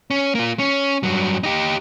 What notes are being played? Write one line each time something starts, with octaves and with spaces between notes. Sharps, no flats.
C#4
A#3 F4
C#4
G2 F#3
D#4 G4